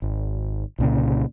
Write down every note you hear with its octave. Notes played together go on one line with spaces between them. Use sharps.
G#1
C2 A#2 C#3